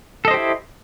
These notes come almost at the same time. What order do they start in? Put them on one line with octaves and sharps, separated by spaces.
A4 D#5 C5 G4 E4